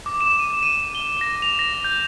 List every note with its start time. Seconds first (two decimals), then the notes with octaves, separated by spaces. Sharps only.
0.06 D6
0.21 E7
0.39 D#7
0.63 D#7
0.95 G7
1.21 A#6
1.42 F7
1.59 A#6
1.84 G6